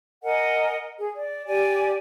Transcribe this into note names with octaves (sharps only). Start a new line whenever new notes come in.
A#4 D#5 F#5 G#5
G#4
D5
G4 D5 G#5